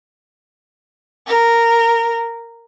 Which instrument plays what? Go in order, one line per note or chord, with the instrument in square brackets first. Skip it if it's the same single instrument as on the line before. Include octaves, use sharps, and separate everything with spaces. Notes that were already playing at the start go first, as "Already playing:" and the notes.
[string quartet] A#4